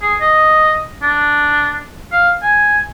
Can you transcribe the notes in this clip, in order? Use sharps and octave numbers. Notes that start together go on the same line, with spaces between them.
G#4
D#5
D4
F5
G#5